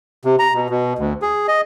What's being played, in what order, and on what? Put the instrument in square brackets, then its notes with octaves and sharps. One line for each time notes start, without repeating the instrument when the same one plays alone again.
[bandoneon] C3
A#5
B2
B2
D2
G#4
D#5